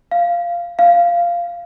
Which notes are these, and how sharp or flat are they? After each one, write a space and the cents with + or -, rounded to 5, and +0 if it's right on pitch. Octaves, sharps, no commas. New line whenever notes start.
F5 -10
F5 -10